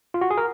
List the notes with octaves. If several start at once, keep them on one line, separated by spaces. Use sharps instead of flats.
F4
F#4
G#4
A#4